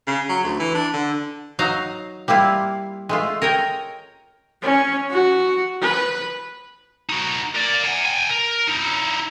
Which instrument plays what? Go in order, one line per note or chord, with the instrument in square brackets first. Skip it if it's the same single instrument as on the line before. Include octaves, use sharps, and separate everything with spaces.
[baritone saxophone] C#3
F#3
D2
E3
D4
D3
[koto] F#3 D#4 F5 A#5
G3 A#3 E4 F4
G#3 A3 F4
A#4 C#5 D#5 G5
[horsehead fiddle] C#4
F#4
B4
[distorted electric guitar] D#4 F#4
A#4 D5
F#5 G#5
G5 G#5
A#4
D#4 E4